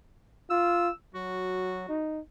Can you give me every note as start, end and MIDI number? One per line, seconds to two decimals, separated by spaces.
0.50 0.89 65
0.50 0.91 88
1.15 1.87 54
1.15 2.02 66
1.88 2.20 63